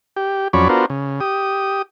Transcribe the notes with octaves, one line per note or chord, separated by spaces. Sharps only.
G4
F2 F#3 C#4 C#5 D5 B5
B3 D4 F4 F#4 A#4 C5
C#3
G4 D#6